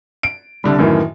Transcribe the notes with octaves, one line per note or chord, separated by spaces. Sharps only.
D7
C2 D3 G3
F#2 A2 D#3 E3